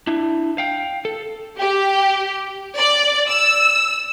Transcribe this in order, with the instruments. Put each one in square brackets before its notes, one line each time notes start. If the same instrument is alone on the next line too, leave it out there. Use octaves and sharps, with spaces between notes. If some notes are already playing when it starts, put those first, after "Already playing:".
[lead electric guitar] D4 E4
F5 G5
A4
[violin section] G4
D5
E6